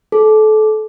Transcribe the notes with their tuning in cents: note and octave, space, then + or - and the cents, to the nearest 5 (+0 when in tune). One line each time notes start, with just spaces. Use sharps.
A4 -30